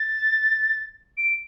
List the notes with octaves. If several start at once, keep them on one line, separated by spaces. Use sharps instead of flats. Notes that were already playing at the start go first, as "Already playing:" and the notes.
Already playing: A6
D7